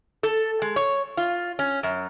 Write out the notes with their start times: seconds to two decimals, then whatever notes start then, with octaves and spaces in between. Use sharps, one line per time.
0.23 A4
0.62 G#3
0.76 C#5
1.17 F4
1.59 C#4
1.83 F#2